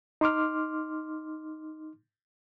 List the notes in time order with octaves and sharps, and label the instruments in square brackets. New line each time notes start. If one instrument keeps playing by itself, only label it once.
[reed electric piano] D#4 C6 D6 F6